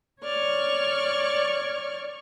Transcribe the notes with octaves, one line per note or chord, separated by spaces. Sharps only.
C#5 D5 C#6 F6